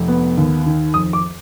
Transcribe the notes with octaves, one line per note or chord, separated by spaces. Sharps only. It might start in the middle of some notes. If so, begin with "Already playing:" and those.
Already playing: F1
B3
D#2
D#3
F2 D#6
D6